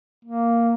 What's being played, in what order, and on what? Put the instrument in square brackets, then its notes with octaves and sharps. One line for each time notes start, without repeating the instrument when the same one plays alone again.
[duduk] A#3